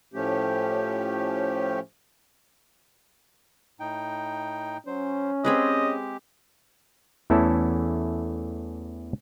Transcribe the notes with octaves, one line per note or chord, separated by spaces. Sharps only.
A2 F3 A3 C#4 G4
A2 D#4 G5
F#3 C#4 C5
G#3 C4 G4 G#4 B4 D#5
E2 E3 A3 C#4 E4 A4